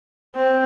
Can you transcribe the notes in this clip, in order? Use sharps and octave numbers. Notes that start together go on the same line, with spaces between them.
C4